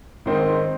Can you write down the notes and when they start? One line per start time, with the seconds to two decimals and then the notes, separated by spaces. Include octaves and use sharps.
0.26 G#2 D#3 C4 D#4